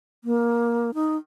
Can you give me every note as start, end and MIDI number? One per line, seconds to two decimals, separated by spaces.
0.24 0.91 58
0.94 1.16 63